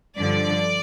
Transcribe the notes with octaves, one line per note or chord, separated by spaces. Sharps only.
G2 D3 F3 D5